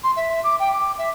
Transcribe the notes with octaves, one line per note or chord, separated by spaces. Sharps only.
C6
E5
D6
G5
D6
E5